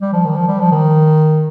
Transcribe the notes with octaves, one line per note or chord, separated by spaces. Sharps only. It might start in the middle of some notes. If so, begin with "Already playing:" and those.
G3
F3
D#3
F3
G3
F3
D#3